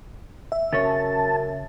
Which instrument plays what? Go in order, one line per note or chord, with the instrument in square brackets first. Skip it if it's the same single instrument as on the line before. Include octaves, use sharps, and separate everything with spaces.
[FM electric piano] E5
[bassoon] F#2 [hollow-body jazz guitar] C#3 C#4 C#5 [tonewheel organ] A5